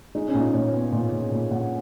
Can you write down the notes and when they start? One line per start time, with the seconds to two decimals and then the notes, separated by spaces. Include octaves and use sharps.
0.15 G#3 D#4
0.28 C#4
0.34 A#2
0.41 D#4
0.54 A#2 C#5
0.73 B3
0.92 A#2
1.12 A#2
1.31 A#2
1.51 A#2 F#5